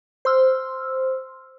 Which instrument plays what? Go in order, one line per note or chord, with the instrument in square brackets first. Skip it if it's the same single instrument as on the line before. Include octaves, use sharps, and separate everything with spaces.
[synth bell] C5 C6 E6 F6